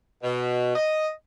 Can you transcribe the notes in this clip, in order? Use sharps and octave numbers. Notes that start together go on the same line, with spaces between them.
B2
D#5